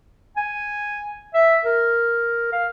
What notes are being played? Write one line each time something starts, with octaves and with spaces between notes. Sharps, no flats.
G#5
E5
A#4
F5